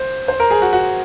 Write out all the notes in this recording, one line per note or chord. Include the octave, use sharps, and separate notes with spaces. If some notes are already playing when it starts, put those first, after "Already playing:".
Already playing: C5
C5
A#4
G#4
F#4
F#4